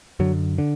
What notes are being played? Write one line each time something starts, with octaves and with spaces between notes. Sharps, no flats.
F#2 D3 F#3
D3